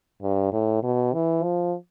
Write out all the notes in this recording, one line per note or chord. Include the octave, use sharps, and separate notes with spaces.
G2
A2
B2
E3
F3